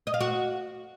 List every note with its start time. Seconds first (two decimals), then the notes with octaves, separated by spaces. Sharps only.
0.07 D#5
0.14 F5
0.20 F#4